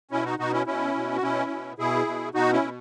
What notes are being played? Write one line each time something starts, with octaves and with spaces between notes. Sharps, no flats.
B2 C#4 E4
D#4 F#4
B2 D#4 F#4
C#4 E4
B2 C#4 E4
B2
F#4
B2 C#4 E4
B2
B2 E4 G#4
B2
B2 D#4 F#4
C#4 E4
B2